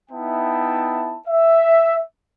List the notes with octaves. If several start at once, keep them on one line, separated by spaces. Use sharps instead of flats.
B3 D#4 E4 E5 G5 A5
E5